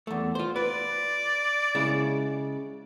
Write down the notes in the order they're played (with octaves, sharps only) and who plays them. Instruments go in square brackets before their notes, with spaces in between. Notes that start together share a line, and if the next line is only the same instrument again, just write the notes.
[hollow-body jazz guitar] E2 A3
F4 C5
[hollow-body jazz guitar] B4 [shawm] D5
[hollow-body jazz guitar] C#3 G#3 E4